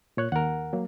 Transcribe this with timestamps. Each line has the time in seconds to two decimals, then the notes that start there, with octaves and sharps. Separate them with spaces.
0.17 A#2 C#5 F#6
0.32 D#2 A#4 F#5
0.73 F#3 A#3